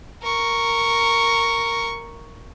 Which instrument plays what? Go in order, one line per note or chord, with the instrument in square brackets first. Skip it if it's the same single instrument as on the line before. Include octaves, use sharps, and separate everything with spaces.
[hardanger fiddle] A#4 C#6